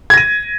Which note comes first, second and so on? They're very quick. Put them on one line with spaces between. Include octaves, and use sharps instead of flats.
G#6 A#6 D#7